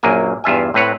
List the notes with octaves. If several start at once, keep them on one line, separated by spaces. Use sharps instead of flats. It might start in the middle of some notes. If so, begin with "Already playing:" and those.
A#1 F#2 F#3 A#3 G#5
E2 G2 F4 E5 G#5
A2 C4 B4 C#5 F#5